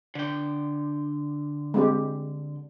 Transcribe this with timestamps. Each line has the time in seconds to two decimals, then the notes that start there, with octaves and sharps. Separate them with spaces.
0.15 D3 G5
1.74 G#3 C4 G4